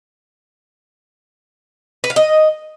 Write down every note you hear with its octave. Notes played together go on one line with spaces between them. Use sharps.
B4
F5
D#5